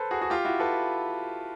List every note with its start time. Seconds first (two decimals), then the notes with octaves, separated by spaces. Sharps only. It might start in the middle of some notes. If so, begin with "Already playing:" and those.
Already playing: A4 B4 C5
0.11 F#4 G#4
0.21 F#4 G#4
0.30 F4 G4
0.45 E4 F#4
0.60 A4 B4